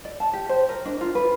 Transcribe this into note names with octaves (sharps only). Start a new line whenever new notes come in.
D5
A5
G4
C5
A#4
D4
F4
B4